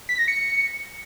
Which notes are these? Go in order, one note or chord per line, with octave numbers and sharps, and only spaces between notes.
B6
A#6
C#7